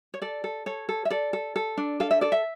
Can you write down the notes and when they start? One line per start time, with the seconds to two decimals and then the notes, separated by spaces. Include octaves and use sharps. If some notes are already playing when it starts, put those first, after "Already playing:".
0.14 C#5
0.22 A4 D5
0.44 A4
0.66 A4 C#5
0.89 A4
1.05 E5
1.10 A4 D5
1.33 A4
1.56 A4
1.77 D4
2.00 A4 F5
2.11 E5
2.21 A4 D5
2.32 E5